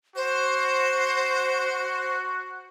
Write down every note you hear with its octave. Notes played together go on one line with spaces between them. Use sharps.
F#4 C5